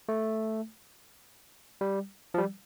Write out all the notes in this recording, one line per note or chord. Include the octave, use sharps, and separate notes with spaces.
A3
G3
F3
G3